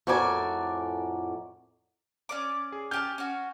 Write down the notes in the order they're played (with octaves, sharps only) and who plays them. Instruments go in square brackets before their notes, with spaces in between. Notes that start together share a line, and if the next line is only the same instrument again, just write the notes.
[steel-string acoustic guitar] F2 A2 F#4 A#4 D5 G#5
[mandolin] C#4 D5 D6
[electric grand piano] G#4
[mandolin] C#4 G4 A5 [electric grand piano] G#5 F6 G6
[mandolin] C#4 F#4